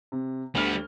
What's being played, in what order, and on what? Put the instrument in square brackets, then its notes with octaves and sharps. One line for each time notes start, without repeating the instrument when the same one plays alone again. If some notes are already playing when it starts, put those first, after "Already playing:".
[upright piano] C3
[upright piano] D2 F6 [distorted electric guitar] G3 B3